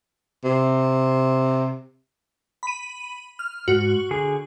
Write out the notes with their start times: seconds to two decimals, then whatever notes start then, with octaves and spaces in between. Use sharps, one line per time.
0.44 C3
2.63 B5 D#7
3.39 F6
3.68 G#2 F#4
4.11 D3 G#4